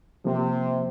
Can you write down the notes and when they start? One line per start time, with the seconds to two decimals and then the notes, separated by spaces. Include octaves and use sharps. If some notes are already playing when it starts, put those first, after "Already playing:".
0.25 C3 F3 A#3